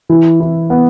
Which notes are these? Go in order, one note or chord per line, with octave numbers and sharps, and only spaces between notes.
E3
E4
B3